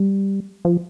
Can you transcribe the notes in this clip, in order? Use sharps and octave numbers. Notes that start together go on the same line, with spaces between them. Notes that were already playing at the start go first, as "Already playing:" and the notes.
Already playing: G3
F3